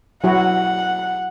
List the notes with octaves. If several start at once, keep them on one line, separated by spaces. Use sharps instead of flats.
F#3 E4 F#4 F#5